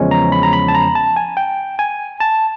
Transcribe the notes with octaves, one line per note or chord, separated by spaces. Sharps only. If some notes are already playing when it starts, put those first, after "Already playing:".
Already playing: E2 C#3 F3 G#3 C#4
A#5
B5
A#5
B5
A5
A#5
A5
G#5
G5
G#5
A5